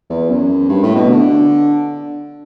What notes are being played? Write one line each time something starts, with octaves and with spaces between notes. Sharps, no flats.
E2
F#2
G2
A2
B2
D3